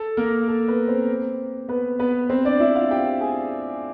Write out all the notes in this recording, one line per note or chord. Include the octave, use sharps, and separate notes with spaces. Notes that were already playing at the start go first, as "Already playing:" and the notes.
Already playing: A4
A#3 A#4
A4
B3 B4
C4 C5
B3 B4
B3 B4
C4 C5
D4 D5
E4 E5
F4 F5
G4 G5
G#4 G#5